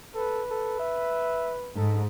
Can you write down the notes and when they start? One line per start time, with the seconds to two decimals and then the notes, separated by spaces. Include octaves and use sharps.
0.14 A4 B4
0.50 A4
0.79 E5
1.77 G#2 A4